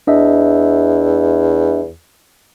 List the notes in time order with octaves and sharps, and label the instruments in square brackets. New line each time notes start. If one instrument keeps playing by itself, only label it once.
[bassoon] E2 [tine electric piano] D4 D#5 E5